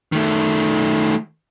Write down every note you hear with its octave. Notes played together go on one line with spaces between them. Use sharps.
D#3 A3